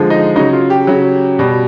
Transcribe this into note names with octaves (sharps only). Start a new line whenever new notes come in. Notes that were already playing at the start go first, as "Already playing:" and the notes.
Already playing: D3 F3 G#3
D#4
C#3 F#3 D#4
F4
G4
C#3 F#3
B2 G3